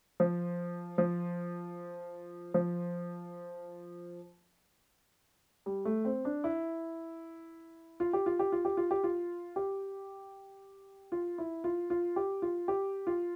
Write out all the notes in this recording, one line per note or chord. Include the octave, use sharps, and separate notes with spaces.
F3
F3
F3
G3
A3
C4
D4
E4
F4
G4
F4
G4
F4
G4
F4
G4
F4
G4
F4
E4
F4
F4
G4
F4
G4
F4